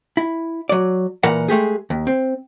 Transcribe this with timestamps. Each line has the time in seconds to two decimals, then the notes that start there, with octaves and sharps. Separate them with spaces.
0.17 E4
0.69 F#3 D5
1.23 A#2 E3 A#4 B4 F#5
1.48 G#3 A3 G4 G#4
1.90 D#2
2.07 C4